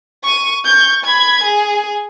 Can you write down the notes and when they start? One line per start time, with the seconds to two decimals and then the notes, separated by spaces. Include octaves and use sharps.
0.24 C#6 D#7
0.65 C#6 G6
1.05 B5 G#6
1.43 G#4